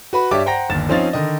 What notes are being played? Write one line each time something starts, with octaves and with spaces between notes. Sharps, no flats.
F#4 B4 B5
G2 G4 C#5 D5 E5 D6
C5 F#5 G5 A#5 A#6
G1 D#2 A6 E7
F3 C4 C#4 D#4 F5 A6
D3 D#3 D#5